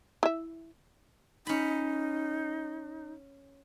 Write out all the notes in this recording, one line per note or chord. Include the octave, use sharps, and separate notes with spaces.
E4 E5
C#4 D#4 B5